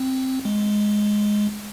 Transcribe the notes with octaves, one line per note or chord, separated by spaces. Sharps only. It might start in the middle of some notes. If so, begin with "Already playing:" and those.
Already playing: C4
G#3